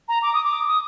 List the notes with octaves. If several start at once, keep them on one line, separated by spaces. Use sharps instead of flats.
A#5
D6
D#6
D6
D#6